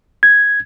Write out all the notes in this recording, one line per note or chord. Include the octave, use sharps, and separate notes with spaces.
G#6